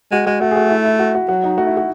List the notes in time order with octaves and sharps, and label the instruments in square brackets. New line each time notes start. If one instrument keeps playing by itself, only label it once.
[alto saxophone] G#3 [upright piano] F#4
[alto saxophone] G#3 [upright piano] F#4
[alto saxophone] A3 [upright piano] F#4
[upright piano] G#4
F#4
E4
E4
F#4
F#4
[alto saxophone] F#3 [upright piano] F#4
[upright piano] D#4
[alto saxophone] A3 [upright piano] F#4
[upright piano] E4
F#4